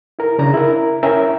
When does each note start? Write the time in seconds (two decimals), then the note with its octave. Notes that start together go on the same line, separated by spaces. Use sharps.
0.19 E4 A#4
0.39 C#3 D4 A#5
0.54 E4 A#4
1.03 C#4 E4 A#4 C#5 E5 G5